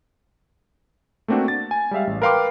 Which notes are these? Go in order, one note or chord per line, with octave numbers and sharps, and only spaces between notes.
A3 A#3 C4 D4 F#4
A6
G#5
G3 G#3 E5 F5
A1
A#4 B4 F5 G5 C6 D6